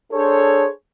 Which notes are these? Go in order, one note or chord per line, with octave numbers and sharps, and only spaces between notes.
D4 G#4 A4 C5 C#5